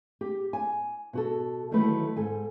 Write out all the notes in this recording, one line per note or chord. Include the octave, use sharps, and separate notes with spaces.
G4
G#5
B2 F#4 A4
D2 D#3 E3 F#3 A3 B4
G#2 A4 G#5